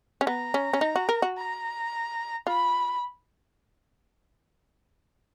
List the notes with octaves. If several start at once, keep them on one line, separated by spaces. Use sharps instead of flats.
C#4
B3 A#5
C#4
C#4
D#4
F#4
A#4
F#4
A#5
F4 B5